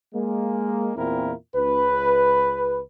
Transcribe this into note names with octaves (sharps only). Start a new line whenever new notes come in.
G#3 A#3
E2 A#2 C4 E4 F4 A#4
C#2 B4